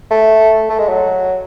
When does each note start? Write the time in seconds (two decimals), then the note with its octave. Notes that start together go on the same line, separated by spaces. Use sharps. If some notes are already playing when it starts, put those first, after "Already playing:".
0.10 A3
0.69 A3
0.79 G#3
0.89 F#3